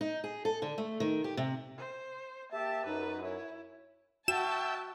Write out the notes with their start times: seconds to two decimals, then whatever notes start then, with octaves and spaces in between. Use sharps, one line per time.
0.01 D#4
0.24 G#4
0.45 A4
0.62 D3
0.78 A3
1.00 D#3
1.24 G4
1.37 C3
1.78 C5
2.52 A#3 G4 E5 A5
2.86 F#2 D#4 B4
3.23 E4 C#5
4.28 F#4 E5 G5 A5 E7